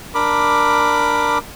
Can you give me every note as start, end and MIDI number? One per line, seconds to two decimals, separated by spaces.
0.14 1.38 62
0.14 1.38 70
0.14 1.38 83
0.14 1.38 86